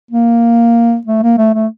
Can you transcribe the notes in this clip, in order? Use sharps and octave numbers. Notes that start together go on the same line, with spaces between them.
A#3
A3
A#3
A3
A3